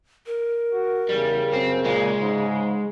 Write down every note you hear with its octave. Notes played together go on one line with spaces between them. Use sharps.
A#4
F#4
E2 C#3 G3
F#2 C4
A#2 G#3
G#2